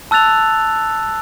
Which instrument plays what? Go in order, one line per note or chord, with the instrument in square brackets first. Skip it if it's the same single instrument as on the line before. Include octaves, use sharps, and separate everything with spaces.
[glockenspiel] A5 E6 F#6 A6 F7